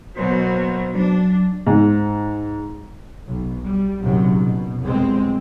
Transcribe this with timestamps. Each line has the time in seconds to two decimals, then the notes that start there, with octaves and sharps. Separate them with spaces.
0.16 B2 F#3 A#3 C5
0.95 F#3 D4
1.67 G#2
3.27 B1
3.65 G3
4.02 A#1 F#2 C3 D#3 F#3
4.39 B2
4.81 F1 C2 F#2 B2 G#3 C4